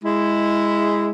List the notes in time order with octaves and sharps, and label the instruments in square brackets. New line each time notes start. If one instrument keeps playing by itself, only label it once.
[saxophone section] G#3 E4